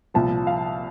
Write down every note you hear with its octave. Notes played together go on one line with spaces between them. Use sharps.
C2 A#2 F3 A5
F5